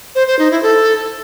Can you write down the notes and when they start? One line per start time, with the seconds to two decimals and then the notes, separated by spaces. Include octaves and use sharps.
0.15 C5
0.27 C5
0.39 D#4
0.51 E4
0.63 A4